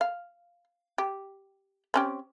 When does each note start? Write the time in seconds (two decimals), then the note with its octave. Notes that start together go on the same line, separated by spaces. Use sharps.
0.01 F5
0.98 G4
1.94 C4 C#4 G4